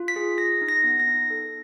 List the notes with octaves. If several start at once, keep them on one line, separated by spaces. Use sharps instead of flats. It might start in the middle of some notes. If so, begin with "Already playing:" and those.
Already playing: F4
B6
G#4
G#4 A#6
D#4
A#6
B3
A#6
D#4
A4